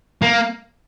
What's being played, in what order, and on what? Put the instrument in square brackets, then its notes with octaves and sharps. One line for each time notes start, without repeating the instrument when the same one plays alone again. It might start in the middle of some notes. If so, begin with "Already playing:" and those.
[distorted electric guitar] A#3